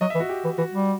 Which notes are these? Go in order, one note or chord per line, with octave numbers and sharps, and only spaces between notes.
F#3 D#5
E5
E3
F#4
G4
E3
E3 F#4
G3